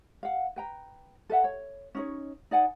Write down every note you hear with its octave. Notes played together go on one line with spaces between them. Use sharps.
F5 F#5
B4 G5 A#5
A4 B4 E5 F#5
C#5
C#4 D#4 C#5
D#4 D5 F#5 G#5